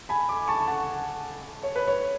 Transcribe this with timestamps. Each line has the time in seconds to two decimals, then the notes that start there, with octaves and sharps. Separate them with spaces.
0.09 G#5 B5
0.29 B5 D6
0.48 A5 C#6
0.67 F#5 A5
1.63 C#5
1.76 B4
1.87 C#5